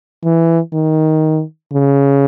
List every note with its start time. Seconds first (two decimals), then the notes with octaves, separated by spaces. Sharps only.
0.24 E3
0.73 D#3
1.73 C#3